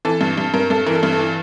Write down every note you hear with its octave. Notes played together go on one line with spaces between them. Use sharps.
E3 A4
G2
G2
G2 A#4
G2 A4
E3 A#4
A4
G2
A4
E3